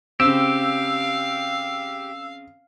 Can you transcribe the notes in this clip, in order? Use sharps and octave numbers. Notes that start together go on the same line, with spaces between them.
C#3 C4 G4 F5 E6